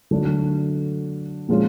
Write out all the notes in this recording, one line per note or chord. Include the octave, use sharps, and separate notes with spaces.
D3 F#3 A3 D4
A#2 F3 G#3 C#4 F4